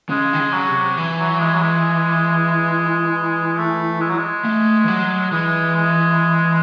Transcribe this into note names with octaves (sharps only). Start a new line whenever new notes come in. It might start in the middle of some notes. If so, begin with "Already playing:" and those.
C#3 G#3
D#3
C#3
F#3
C3
E3
F#3
G#3
F#3
G#3
A3
G#3
F#3
G#3
A3
E3
F#3
E3 G#3
G#3